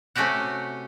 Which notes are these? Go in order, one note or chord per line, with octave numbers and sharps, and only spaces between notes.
C3 A3 C#4 F#4 G4 F#5